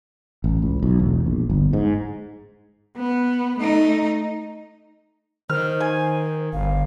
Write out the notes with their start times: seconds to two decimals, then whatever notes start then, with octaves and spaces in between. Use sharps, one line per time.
0.44 A1
0.62 C#2
0.83 B1
0.99 E1
1.26 A#1
1.50 G1
1.73 G#2
2.97 B3
3.59 A3 D#4
5.50 D#3 C5 F6
5.81 G#5
6.53 G1 F5